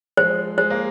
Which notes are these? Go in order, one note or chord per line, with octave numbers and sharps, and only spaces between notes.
F3 G#3 C5
G#3 C5
A#3